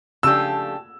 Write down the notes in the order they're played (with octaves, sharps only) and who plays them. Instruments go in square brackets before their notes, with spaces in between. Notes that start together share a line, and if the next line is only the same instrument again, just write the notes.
[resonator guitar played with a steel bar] C#3 F3 A3 D4 G4 [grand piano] E6